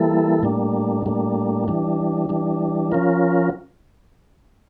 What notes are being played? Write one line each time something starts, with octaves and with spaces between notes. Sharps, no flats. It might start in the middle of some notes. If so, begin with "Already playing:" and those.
Already playing: E3 G3 A#3 E4 A4
A2 G3 A#3 D4
A2 G3 A#3 D4
E3 G3 D4
E3 G3 D4
F3 C#4 F4 A#4